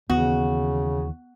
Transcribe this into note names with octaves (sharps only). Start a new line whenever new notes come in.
D#2 C#3 E3 B3 F#4